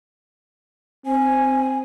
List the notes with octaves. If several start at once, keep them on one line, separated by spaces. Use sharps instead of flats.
C4 G#5